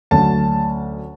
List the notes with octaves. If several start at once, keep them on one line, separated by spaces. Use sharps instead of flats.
D2 D3 F#3 C#4 A5